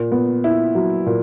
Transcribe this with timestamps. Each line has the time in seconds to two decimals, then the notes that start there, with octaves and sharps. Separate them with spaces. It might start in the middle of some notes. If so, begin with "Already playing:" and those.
Already playing: A#2
0.12 B3
0.44 E4
0.75 F#3
1.06 A#2